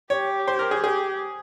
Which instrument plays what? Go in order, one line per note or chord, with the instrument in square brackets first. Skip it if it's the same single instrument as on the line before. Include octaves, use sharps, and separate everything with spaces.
[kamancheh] G4 [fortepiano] C#5
[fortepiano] C5
A#4
G#4
[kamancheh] G4 [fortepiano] G#4